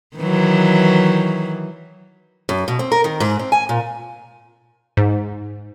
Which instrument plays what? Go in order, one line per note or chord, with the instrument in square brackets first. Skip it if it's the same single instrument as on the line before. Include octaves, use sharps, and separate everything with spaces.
[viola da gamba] D#3 E3 F#3
[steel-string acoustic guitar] F#2
B2
C4
A#4
D#3
G#2
C4
G#5
A#2
[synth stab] G#2